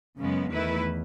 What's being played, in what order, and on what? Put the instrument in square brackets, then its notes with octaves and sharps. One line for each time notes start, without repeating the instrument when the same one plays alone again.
[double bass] F#2 [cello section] C#3 G#3 B3
[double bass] E2 [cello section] D#3 A3 E4 B4